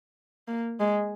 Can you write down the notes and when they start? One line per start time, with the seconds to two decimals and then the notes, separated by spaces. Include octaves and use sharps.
0.48 A#3
0.80 G#3